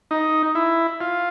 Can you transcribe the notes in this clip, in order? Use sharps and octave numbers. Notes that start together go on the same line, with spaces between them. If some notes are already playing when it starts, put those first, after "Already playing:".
D#4
E4
F4